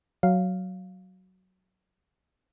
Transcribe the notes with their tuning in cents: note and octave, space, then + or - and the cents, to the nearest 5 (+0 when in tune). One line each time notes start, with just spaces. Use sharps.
F#3 +5 F5 +0